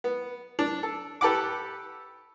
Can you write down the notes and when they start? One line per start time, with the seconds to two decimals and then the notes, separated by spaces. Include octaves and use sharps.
0.04 B3
0.59 D4
0.83 A4
1.21 G4 A4 B4 F#5 D6